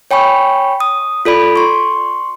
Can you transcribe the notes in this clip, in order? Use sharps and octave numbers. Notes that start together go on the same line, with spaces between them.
C#5 G5 G#5 B5 C#6
D#6
F4 A4 D5 B5 D7
C6 C#6